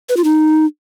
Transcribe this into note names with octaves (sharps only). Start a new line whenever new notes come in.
B4
F4
D#4